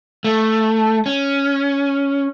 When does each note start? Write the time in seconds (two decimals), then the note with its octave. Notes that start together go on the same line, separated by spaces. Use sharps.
0.24 A3
1.06 C#4